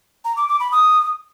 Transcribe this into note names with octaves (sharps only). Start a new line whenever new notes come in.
A#5
D6
D6
B5
D#6